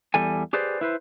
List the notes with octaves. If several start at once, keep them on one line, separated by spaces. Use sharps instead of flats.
E2 G3 A4 G#5
G4 G#4 B4 C5 D5
E4 B4 C5